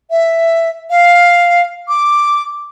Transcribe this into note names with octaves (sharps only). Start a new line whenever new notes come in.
E5
F5
D6